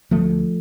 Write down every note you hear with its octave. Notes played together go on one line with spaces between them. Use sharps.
D2 F3 A3